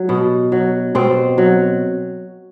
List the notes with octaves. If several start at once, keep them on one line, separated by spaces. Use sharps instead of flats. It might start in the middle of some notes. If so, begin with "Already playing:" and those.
Already playing: F#3
B2
F#3
B2 C4
F#3